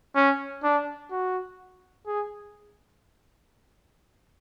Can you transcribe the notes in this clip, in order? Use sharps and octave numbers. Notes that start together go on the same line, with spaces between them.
C#4
D4
F#4
G#4